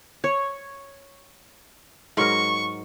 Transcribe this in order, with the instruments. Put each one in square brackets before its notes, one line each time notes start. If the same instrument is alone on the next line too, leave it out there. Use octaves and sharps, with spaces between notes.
[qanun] C#5
[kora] G#2 F#3 A#4 [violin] C#6